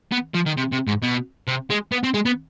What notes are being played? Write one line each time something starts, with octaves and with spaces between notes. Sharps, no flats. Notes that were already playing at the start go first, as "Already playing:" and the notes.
B3
F3
D#3
C3
C3
G#2
B2
C3
G#3
B3
C4
G#3
B3